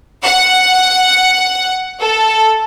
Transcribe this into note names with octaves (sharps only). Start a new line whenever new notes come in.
F#5
A4